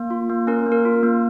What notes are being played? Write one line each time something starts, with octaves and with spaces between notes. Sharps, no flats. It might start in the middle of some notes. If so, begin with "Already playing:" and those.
Already playing: A#3
F4
A#3
C#4 A#4
A#3
A#4
F4
A#3